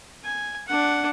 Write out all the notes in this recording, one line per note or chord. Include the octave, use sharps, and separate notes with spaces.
G#5
D4 F#5